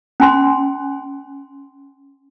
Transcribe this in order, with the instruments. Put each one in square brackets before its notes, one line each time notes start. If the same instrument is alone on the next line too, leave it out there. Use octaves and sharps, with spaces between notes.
[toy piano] C#4 G#5 C6